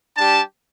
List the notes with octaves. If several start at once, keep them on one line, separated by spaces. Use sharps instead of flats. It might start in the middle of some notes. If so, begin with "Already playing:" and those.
G3 D4 G4 A5